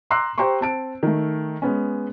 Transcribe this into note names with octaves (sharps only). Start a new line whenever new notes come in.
A#5 C6 D6 E6 F#6 C7
G4 C5 G5 A#5 C6 C#6
C4 A5 D7
D#3 A3
G#3 B3 C#4